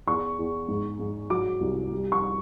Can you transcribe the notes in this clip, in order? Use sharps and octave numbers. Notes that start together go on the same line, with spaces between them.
E2 C#6
E2
G#2
G#2
F#3 D6
C2
G3
C#6